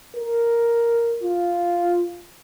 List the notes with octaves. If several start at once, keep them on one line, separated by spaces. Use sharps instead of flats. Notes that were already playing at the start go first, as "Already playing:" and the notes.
A#4
F4